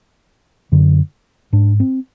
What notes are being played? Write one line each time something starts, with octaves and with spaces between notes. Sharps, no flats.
F#2 D3
G#2 D4
C4